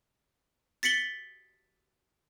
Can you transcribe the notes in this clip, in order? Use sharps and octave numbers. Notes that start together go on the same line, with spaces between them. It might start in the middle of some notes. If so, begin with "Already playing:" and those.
A6 B6 C#7 F#7 G7